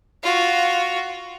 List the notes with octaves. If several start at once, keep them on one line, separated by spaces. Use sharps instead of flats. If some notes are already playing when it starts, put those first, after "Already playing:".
F4 F#4